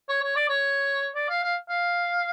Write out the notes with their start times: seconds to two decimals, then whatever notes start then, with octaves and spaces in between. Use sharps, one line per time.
0.09 C#5
0.23 C#5
0.36 D5
0.49 C#5
1.15 D5
1.29 F5
1.43 F5
1.69 F5